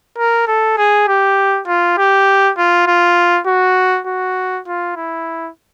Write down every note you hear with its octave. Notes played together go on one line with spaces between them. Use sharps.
A#4
A4
G#4
G4
F4
G4
F4
F4
F#4
F#4
F4
E4